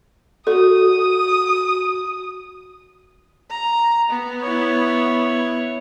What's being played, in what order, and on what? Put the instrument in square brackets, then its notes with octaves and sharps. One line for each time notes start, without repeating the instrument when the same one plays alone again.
[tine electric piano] F#4 [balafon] A4 [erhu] D#6
[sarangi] A#5
B3
[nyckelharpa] E4 C#5